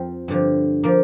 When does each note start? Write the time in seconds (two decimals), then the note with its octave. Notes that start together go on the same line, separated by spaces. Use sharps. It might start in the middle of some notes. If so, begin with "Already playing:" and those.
Already playing: F2 F3 C4 F4
0.28 G2 D3 F3
0.84 F3 A#3